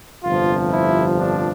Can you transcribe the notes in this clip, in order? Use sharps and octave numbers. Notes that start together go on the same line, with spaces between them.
G1 F2 C3 F3 F4
E4
D4